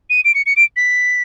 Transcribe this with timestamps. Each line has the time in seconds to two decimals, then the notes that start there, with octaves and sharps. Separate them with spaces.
0.10 D#7
0.25 D7
0.35 C#7
0.46 C#7
0.56 D7
0.76 B6